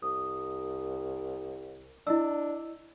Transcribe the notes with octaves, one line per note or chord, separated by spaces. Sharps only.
C2 D#6
D4 E4 D#5 E6